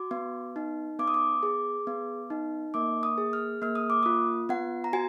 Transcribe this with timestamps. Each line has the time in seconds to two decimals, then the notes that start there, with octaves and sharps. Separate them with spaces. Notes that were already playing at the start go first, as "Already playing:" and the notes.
Already playing: F#4 D6
0.11 B3
0.56 D#4
0.99 B3 D6
1.08 D#6
1.14 D6
1.43 G#4
1.87 B3
2.30 D#4
2.74 A#3 D6
3.03 D#6
3.18 G#4
3.33 F6
3.62 A#3 F6
3.75 D#6
3.90 D6
4.03 F4 D#6
4.49 B3 F#5
4.84 A#5
4.93 F#4 G#5